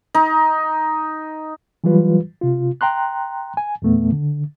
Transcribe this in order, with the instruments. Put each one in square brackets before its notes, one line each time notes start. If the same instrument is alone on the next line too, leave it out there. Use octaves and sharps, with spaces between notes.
[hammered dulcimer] D#4
[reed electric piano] E3 F#3 G3 F4 B4
C3 F4
G5 A#5 C6 F#6
G#5
E2 A#2 A3 B3
D3